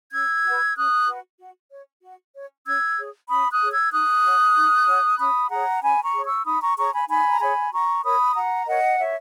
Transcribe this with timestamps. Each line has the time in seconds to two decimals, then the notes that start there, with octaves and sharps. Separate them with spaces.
0.12 C#4 E6 G#6
0.45 F#4 B4
0.76 C#4 D#6 F#6
1.07 F#4 B4
1.40 F#4
1.71 C#5
2.03 F#4
2.35 C#5
2.66 C#4 E6 G#6
2.97 G#4 C#5
3.29 C#4 B5 D#6
3.51 D#6 F#6
3.61 G#4 C#5
3.71 E6 G#6
3.92 D#4 D#6 F#6
4.24 F#4 C#5
4.56 D#4
4.87 F#4 C#5
5.19 C#4 B5 D#6
5.50 G#4 C#5 F#5 A#5
5.82 C#4 G#5 B5
6.03 A#5 C#6
6.13 G#4 C#5
6.25 C#6 E6
6.45 D#4 B5 D#6
6.61 A#5 C#6
6.77 G#4 C#5 A#5 C#6
6.93 G#5 B5
7.08 D#4 G#5 B5
7.29 A#5
7.40 G#4 C#5 G#5 B5
7.72 F#4 A#5 C#6
8.03 A#4 C#5 B5 D#6
8.35 F#4 F#5 A#5
8.67 A#4 C#5 D#5 F#5
8.99 F#4 C#5 E5